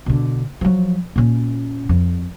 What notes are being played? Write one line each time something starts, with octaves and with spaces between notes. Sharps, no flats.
B2 D3
F3 F#3
A#2 C#4
F2